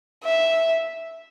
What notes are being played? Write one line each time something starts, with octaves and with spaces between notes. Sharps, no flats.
E5